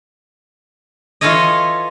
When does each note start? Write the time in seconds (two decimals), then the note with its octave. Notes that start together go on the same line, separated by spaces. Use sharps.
1.21 E3 F4 A4 C#5 D#5